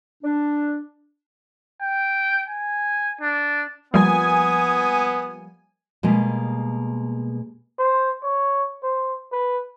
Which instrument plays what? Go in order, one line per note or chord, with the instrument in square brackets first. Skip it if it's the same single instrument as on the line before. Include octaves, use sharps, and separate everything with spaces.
[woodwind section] D4
[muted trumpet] G5
G#5
D4
[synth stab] F3 G3 A#3 [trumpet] B3 [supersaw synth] G#5 [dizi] D#6
[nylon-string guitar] B2 G3 G#3 A#3
[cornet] C5
C#5
C5
B4